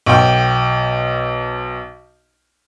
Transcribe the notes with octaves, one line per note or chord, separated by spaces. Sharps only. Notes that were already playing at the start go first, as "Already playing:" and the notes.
B1 G5